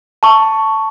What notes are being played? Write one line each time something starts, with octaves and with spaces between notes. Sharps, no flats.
A5 C#6